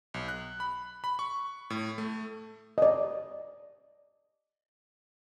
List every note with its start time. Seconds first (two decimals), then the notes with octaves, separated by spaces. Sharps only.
0.14 B1
0.28 F#6
0.60 B5
1.04 B5
1.19 C#6
1.70 A2
1.98 A3
2.78 D5 D#5